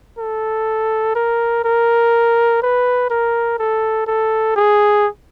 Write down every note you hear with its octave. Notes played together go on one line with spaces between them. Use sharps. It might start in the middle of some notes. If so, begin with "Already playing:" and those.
A4
A#4
A#4
B4
A#4
A4
A4
G#4